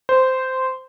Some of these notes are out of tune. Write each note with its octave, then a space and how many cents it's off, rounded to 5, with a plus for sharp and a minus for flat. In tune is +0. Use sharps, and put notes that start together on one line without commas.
C5 -10